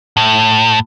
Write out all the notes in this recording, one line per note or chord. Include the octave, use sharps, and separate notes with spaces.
A2